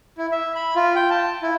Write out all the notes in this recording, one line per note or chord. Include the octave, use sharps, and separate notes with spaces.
E4
E5
B5
F4
G5
A5
E4